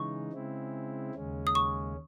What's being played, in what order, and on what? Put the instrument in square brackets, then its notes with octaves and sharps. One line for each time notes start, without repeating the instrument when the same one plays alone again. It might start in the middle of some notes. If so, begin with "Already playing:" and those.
Already playing: [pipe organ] C#3 E3 G#3 D#4 [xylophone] C#6
[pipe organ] C#3 G#3 C4 E4
D#2 C#3 G#3 C#4
[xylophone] D#6
C#6